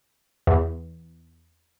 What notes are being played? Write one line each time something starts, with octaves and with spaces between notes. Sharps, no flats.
E2